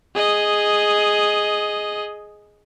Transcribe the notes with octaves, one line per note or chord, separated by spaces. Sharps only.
G#4 D#5